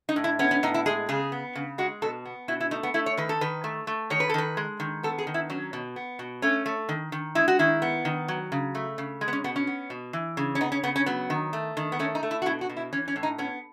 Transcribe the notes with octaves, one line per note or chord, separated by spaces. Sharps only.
D#4
A2
E4
B3 C#4
C#4
A2 D#4
E4
G#3 G#4
C#3 G#4
B3
C#3
G#3 F#4
B2 A4
B3
B2 E4
E4
A3 D#4
B3
A3 E4
C#5
D#3 B4
A4
D#3 B4
A3
A3
D#3 C#5
B4
A4
D#3 B4
G#3
D#3
B3 A4
G#4
D#3
E4
F#3 C#4
B2
B3
B2
A3 C#4
A3
D#3
D#3
G#3 E4
F#4
D#3 E4
B3
D#3
F#3
C#3
A3
C#3
G#3
B3
C#4
B2 B3
C#4
B3
B2
E3
C#3
C#4
B3 D#4
C#4
C#3 B3
C#4
F#3 B3
D#3
A3
D#3
B3
A3 C#4
D#4
A3
E4
F#4
B2 E4
F#4
B2
E4
E3 C#4
C#4
A2
D#4
B3 C#4